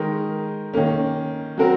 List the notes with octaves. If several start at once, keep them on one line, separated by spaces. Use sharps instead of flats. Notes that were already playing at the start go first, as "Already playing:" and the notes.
Already playing: D#3 G#3 D#4 A#4
D#3 A#3 C#4
F#3 C4 F#4 A#4